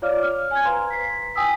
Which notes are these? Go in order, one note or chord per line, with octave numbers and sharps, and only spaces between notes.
F4 C#5 D5 F5 D6 F6
F6
G#5 G#6
B4 C5 F5 A#5 C6
B6 C7
G5 G#5 D#6 E6 B6